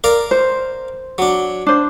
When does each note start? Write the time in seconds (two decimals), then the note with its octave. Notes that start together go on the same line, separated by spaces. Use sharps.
0.04 A#4 D5 F5
0.31 C5
1.18 F#3 D4
1.66 D4 C5